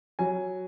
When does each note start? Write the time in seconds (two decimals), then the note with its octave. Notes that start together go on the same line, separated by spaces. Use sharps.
0.19 F#3 G#5